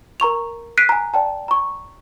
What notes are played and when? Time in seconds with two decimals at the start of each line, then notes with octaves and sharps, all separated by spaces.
0.20 A#4 A#5 C#6 F7
0.78 F#6 B6 C7 D7 D#7
0.89 G#5 A#5
1.14 D5 G5 A5
1.48 A#5 C#6